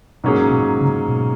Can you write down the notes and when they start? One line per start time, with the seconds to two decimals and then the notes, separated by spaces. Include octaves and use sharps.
0.24 G#2 B2 F#3 A#3 C#4 G#4
0.51 B2
0.80 C#3
1.09 B2